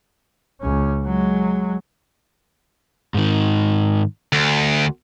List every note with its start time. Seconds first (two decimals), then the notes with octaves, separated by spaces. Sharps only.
0.61 C#2 C#4
1.05 F#3 G#3
3.14 G#2 D#3
4.33 D2